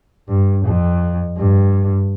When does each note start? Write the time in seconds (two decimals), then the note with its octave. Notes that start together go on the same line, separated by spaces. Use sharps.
0.28 G2
0.66 F2
1.37 G2